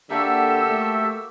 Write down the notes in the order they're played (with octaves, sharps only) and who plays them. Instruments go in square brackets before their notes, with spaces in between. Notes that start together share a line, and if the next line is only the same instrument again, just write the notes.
[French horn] D3 [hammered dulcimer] A#3 F#4 [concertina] G4 A4 E5 [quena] E6
[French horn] A3